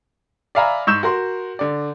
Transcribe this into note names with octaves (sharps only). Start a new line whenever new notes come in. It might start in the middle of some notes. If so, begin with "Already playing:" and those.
D5 E5 F5 G#5 A#5 B5
G#2 C#6 E6 G6 E7
F#4 A#4 C6
D3 D5